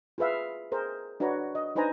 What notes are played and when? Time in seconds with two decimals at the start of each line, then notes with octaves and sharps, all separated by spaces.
0.18 F4 G#4 B4 E5 F5
0.72 G#4 A#4 C5
1.20 D4 F#4 B4 C#5 A#5
1.55 D#5
1.75 D4 D#4 B4 C5 G#5 A#5